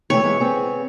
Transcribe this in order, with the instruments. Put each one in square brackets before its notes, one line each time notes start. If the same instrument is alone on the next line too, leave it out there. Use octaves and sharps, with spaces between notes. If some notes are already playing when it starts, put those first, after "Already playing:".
[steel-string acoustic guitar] C3 E3 A3 [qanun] C#5
[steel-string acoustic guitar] E3 G#3 B3
B3 C4 G#4